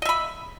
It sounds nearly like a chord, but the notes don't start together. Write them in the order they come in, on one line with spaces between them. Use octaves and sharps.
D#5 E5 B5